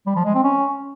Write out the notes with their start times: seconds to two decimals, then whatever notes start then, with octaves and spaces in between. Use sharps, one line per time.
0.06 G3
0.16 F3
0.25 G#3
0.34 C4
0.44 C#4